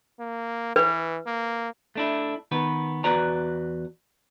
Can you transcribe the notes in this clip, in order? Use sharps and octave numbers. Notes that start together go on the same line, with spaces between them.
A#3
E3 B4
A#3
A3 D4 E4
D#3 B3 B4
E2 F#4 B4 D5 A#5